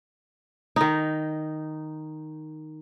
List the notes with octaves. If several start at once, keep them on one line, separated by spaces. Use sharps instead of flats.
D#3 D#4